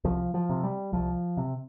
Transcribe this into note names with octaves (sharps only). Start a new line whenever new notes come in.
C2 F3
F3
C3
G3
C2 F3
C3